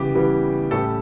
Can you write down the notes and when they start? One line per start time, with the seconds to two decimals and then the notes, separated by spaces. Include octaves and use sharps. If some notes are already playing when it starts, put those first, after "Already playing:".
Already playing: C#3 E3 G3 B3 G4
0.14 C#3 E3 G3 B3
0.71 A2 G3 C#4 A4